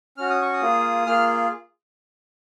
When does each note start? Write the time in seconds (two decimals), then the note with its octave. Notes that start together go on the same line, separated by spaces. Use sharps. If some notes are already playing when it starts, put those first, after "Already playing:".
0.17 C#4 F#4 F6
0.30 D#6
0.42 C#6
0.53 D#6
0.62 A#3 F4 G#4
1.06 A#3 F4 G#4 F6